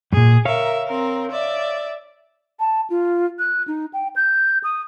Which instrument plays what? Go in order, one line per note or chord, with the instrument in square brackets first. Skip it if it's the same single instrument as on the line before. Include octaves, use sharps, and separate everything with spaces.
[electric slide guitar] F#2 A#2 [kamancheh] G#4
[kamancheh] A#4 E5 [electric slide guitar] C#5 F5
[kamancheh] C4 A#4
D5 E5
[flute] A5
F4
F#6
D#4
G5
G6
D#6